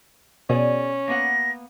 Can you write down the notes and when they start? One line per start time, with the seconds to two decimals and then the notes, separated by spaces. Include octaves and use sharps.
0.50 B2 C#4 G#4 D5
1.08 A#3 B3 F#5 A#6